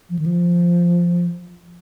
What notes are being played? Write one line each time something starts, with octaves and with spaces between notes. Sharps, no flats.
F3
D#3
F3